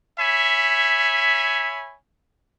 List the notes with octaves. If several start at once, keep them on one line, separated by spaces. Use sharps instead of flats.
C#5 E5 G#5 B5